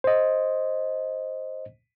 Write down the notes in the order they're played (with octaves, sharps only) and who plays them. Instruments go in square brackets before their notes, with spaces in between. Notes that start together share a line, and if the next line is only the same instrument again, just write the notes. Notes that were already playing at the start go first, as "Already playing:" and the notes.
[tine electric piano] C5 D#5